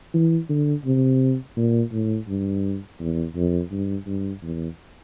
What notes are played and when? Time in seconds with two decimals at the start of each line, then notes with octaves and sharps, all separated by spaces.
0.14 E3
0.49 D3
0.85 C3
1.56 A#2
1.92 A2
2.28 G2
3.00 E2
3.36 F2
3.72 G2
4.07 G2
4.42 E2